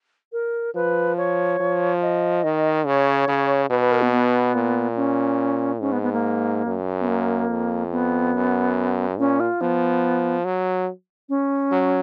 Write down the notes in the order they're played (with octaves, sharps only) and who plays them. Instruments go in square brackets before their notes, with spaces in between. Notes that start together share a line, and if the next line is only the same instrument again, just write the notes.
[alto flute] A#4
[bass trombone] F3 [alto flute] B4
[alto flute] C#5
[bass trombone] F3
[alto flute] D#5
[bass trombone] D#3
[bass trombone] C#3 [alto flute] C#5
[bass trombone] C#3
[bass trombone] B2 [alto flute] B4
[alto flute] B4
A#4
B3
B3
[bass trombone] A#2
[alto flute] C#4
[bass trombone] G#2 [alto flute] C#4
[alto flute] B3
B3
A#3
[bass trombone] F#2
[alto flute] B3
A#3
[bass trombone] F2
[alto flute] B3
[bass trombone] F#2
[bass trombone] A#2 [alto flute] C#4
[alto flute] F4
[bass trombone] F3 [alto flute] B3
[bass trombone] F#3
[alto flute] C#4
[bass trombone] F#3